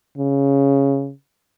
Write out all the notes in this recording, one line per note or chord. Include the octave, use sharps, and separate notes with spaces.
C#3